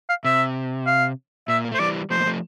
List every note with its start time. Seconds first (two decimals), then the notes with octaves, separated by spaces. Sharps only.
0.09 F5
0.24 C3 E5
0.87 F5
1.48 A#2 E5
1.65 A#3
1.72 A3
1.74 C5
1.79 E3 G3 D5
2.10 F3 A3 C5
2.20 A#3
2.26 F3 A3